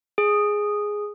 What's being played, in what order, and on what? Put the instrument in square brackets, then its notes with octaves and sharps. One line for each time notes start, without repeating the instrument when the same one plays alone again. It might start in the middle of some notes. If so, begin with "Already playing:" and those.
[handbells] G#4